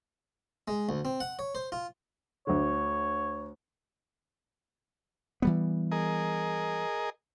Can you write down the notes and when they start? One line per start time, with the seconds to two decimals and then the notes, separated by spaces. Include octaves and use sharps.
0.68 G#3
0.89 D2
1.05 C4
1.20 F#5
1.39 C#5
1.55 C5
1.72 F4
2.47 D2 D3 C#5
5.42 E3 G3 B3
5.92 G#4 A#4 D#5